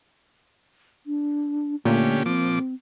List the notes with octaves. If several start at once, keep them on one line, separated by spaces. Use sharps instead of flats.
D4
A#2 D3 A3 C#4 G4
F3 C4 D6